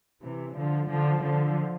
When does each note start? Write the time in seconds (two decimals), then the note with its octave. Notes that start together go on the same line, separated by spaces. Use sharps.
0.21 C3 E3
0.55 D3 F3
0.89 D3 F3
1.22 D3 F3